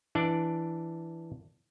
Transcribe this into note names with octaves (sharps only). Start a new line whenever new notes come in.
E3 D4 D5